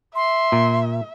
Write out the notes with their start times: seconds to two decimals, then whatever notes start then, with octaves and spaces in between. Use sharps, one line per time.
0.15 E5 C6
0.52 A#2